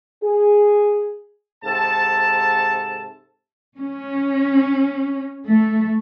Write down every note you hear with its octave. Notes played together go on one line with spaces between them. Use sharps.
G#4
G#2 C3 A4 A5
C#4
A3